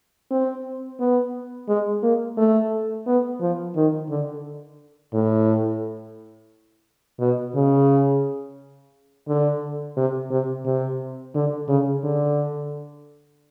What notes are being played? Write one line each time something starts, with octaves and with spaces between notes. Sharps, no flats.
C4
B3
G#3
A#3
A3
B3
F3
D#3
D3
A2
B2
C#3
D3
C3
C3
C3
D3
C#3
D3